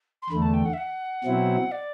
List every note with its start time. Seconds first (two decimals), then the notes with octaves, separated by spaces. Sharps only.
0.22 C6
0.29 E2 D3 A3 B5
0.42 A5
0.53 G5
0.65 F#5
0.73 E5
0.77 F#5
1.24 B2 F#3 C4 E4
1.71 D5